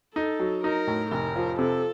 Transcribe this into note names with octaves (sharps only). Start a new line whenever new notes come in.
D#4 A4
F#3
D#4 A#4
A2
F1 A#4
F3
C3 A4